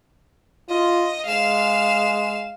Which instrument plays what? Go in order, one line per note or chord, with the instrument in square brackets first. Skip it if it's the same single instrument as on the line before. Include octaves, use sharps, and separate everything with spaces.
[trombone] F4 [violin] D#5
[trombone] G#3 [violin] F5 E7